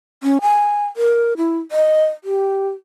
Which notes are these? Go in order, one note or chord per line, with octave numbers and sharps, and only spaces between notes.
C#4
G#5
A#4
E4
D#5
G4